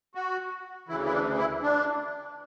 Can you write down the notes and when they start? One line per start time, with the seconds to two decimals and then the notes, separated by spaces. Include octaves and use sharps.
0.15 F#4
0.88 D2 C#3 E3 E4
1.06 E4
1.13 D4
1.38 E4
1.62 D4